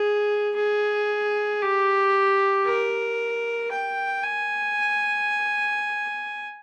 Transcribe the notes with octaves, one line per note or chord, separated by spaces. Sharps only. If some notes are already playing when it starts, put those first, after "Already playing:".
Already playing: G#4
G#4
G4
A#4
G5
G#5